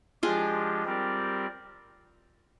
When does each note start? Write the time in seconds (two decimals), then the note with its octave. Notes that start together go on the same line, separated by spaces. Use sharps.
0.23 F3 G#3 D4 F4 G4 G#4
0.85 G3 C4 G4 A#4 D5